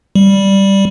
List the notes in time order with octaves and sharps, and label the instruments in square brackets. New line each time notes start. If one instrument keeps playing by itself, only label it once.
[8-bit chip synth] G3